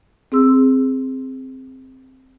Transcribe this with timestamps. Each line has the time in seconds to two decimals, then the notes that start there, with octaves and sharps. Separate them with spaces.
0.32 C4 G#4 C6 E6